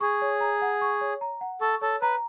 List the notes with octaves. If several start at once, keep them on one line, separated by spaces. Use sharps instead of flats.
G#4 C#6
C#5
A#5
F#5
C#6
C#5
A#5
F#5
A4 C#6
A4 C#5
B4 A#5